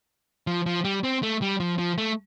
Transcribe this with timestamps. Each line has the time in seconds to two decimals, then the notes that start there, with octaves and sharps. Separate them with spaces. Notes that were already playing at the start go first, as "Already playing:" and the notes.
0.47 F3
0.66 F3
0.85 G3
1.04 C4
1.23 A3
1.42 G3
1.60 F3
1.78 F3
1.98 A3